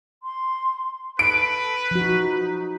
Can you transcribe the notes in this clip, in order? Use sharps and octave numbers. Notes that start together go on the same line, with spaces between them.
C6
A4 B4 D7
F3 D#4 F#4